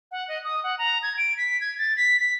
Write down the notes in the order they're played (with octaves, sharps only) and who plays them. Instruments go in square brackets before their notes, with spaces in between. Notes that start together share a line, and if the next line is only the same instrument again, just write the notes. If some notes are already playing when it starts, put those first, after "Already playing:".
[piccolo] F#5
D#5
D#6
F#5
A#5
G#6
D7
B6
G#6
A6
B6
B6